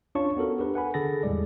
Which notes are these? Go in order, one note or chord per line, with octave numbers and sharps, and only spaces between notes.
C#4 D4 F4 C#5 A5 C#6
B3 F#4 A4 A#4
D4 G4 A#4 B4
F#5 G#5 B5
D3 G#4 A4 A6 A#6
E2 A2 G3 G#3 D5